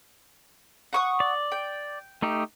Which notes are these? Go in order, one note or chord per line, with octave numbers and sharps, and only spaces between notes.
F#5 C#6 D#6
D5
G5
A3 D#4 G4